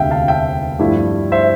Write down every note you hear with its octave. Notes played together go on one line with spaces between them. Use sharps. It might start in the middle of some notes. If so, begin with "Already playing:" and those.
Already playing: E1 D2 C3 E5 F5 G5
F5 A5
E5 G5
G2 F3 A3 E4
C5 E5